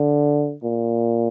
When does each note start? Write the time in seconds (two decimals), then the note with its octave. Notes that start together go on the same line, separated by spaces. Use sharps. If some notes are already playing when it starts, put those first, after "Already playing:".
Already playing: D3
0.64 A#2